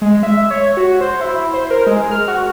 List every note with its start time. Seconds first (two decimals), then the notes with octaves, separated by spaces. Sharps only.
0.02 G#3
0.23 E5
0.50 C#5
0.77 F#4
1.01 C5
1.21 E4
1.54 C5
1.70 A#4
1.87 G#3
2.11 F6
2.28 F#4